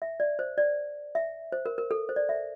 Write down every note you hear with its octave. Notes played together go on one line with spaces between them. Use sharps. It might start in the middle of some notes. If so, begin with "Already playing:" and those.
E5
D5
C5
D5
E5
C5
A#4
A#4
A4
C5
D5
E5